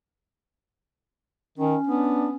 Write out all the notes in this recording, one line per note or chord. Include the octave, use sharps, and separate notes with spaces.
D#3 C#4
B3 D4